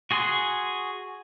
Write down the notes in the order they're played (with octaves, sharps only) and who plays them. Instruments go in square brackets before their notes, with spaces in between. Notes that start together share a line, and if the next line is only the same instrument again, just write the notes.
[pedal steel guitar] F#4 G#4 G#5 C6